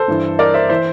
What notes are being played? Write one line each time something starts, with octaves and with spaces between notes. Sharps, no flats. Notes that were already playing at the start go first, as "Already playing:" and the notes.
Already playing: A4 C5
G2 E3
A#4 D5
C5 E5
E3 C5 E5